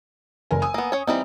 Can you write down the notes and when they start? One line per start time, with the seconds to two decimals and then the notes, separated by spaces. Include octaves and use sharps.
0.51 F#1 A#4 G#5
0.62 G#5 D#6 E6
0.74 A#3 B3
0.92 C#4 C#5
1.07 E3 G3 C4 D#4